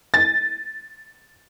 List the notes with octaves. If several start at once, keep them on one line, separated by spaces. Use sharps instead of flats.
A6